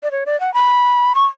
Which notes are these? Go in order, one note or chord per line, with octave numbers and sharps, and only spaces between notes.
D5
C#5
D5
F#5
B5
C#6